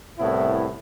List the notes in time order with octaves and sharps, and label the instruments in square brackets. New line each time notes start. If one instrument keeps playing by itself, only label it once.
[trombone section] C2 A2 B3 E4